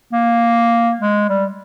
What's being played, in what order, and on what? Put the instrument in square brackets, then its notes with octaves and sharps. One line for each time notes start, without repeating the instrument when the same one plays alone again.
[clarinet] A#3
G#3
G3